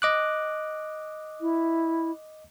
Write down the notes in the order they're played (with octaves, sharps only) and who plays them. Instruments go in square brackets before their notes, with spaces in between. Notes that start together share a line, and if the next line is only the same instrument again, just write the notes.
[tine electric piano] D#5 D6 F#6
[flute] E4